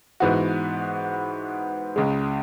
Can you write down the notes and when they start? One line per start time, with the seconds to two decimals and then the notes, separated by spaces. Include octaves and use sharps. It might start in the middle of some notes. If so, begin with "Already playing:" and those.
0.20 G#2 E3 B3 F#4
1.96 C#2 C#3 G#3